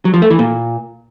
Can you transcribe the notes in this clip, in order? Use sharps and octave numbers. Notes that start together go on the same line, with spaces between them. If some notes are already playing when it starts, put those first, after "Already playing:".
F#3
F3
A3
E3
A#2